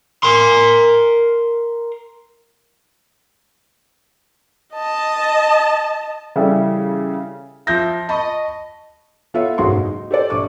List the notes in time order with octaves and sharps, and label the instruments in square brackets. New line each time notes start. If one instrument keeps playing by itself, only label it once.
[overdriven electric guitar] A#4 C6
[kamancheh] D#5 A5
[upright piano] C#3 E3 G3 E4 A4
[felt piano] F3 G6 A#6 [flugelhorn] E5
[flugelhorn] D#5 [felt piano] A5 B5 C#6
[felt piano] B3 F4 A4 C#5 E5
F#1 B1 G#2 F#4 G#4 C6
D#4
G4 A4 C5 D5
A#1 C#6 D6